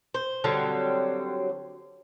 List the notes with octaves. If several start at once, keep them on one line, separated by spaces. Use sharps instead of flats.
C5
D3 F#3 G3 C4